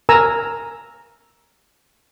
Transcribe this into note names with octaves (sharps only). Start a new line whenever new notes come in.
A#4 G#5 A#5 E6